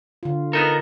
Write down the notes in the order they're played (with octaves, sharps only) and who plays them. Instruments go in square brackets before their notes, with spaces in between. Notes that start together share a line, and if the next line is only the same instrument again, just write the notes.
[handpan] D3 F4
[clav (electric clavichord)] B3 D#4 A4 [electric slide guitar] A#4